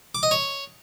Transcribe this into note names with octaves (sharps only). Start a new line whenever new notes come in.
D6
D#5
C#5